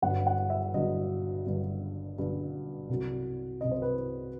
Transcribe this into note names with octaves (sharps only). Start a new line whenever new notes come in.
G1 G2 F#3 F#5
F#5
E5
G1 G2 F#3 D#5
G1 G2 F#3
G1 G2 F#3
C2 C3 F#3
C2 C3 F#3 D#5
C5
B4